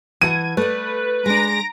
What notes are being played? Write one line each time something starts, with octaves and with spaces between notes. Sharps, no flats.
E3 F#5 A5 G#6 D#7
A3 B4 D5
G#3 D4 A#5 A#6 D7